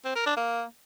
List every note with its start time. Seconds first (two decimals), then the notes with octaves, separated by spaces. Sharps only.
0.05 C4
0.16 A#4
0.26 D4
0.37 A#3